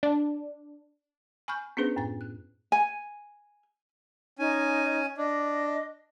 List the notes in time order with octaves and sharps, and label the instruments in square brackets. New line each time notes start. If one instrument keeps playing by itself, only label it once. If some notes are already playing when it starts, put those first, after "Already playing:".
[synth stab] D4
[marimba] G#5 B5 C#6 F6 G6
B3 C#4 D4 G#4 B4 C5
F#2 A2 A6
F#6
[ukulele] G#5
[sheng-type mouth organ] C#4 G#5 [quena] D#4
[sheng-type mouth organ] D4 [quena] D#5